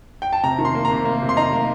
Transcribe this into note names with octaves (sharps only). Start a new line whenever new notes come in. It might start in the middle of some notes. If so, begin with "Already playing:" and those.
G5
A5
C3 A#5
D#3
C6
A#3
A#5
C3
A#3
C3
C6
D#4 A#5
A#3